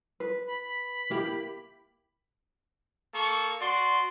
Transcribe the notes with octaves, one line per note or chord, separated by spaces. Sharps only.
B4
B5
A#3 E4 G4
A#3 A4 C#6
F#4 D5 C6